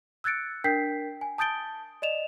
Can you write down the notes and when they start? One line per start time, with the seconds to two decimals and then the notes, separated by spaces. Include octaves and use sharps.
0.24 E6 F#6 G#6 A6 C#7 D7
0.64 D4 A#4 G5 G6 B6 C7
1.21 G#5
1.38 A5 D#6 G6 A6 D7 G7
2.02 D5 D#5 E7 F7